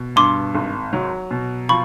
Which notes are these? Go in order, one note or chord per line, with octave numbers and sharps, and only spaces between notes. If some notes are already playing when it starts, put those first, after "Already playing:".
Already playing: B2
G2 C6 D6
G#1
F#3
B2
F3 B5 C#6